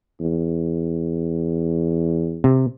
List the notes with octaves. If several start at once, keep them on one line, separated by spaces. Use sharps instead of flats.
E2
C3